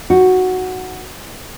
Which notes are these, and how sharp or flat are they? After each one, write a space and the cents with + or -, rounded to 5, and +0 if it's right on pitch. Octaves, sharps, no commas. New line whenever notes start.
D#4 +15 F#4 +0